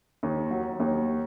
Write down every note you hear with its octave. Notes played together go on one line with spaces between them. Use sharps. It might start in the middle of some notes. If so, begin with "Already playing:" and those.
D#2
F#3
D#2